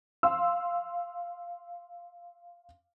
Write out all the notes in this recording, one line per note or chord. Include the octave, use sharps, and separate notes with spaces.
F5 C6 E6